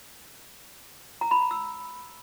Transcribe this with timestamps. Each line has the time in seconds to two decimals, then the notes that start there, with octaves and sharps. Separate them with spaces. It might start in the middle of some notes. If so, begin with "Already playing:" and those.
1.21 A#5
1.31 B5
1.41 A#5
1.51 E6